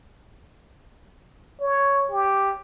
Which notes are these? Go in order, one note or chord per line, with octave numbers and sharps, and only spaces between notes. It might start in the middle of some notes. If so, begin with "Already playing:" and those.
C#5
G4